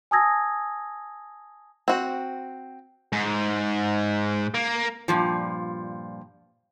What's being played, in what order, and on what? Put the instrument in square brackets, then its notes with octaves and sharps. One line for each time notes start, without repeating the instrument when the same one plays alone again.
[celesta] G#5 A5 D#6 E6 G#6 A#6
[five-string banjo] C4 F#4
[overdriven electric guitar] G#2
A#3
[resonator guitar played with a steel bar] G2 A#2 F3